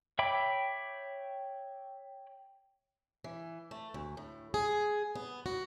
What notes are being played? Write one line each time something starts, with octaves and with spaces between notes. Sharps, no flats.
C#5 E5 G5 B5 D6
E3
A3
D2
A2
G#4
B3
F#4